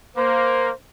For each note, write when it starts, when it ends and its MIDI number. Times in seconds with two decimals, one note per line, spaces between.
0.16 0.69 58
0.16 0.71 72